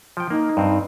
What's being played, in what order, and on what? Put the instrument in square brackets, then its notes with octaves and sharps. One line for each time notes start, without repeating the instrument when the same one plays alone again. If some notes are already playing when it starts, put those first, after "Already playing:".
[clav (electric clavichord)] F3 G5
[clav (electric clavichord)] A#3 [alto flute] D#4
[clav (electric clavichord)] G2 C4